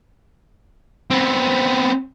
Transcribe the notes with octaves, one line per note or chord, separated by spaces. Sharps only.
B3 C4